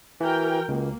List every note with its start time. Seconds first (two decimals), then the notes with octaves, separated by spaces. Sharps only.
0.21 E3 F#4 A#4 G5
0.68 C#2 A#3